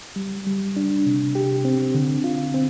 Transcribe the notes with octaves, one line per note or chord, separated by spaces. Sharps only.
G3
G3
D4
C3
G4
C4
D3
F4
C4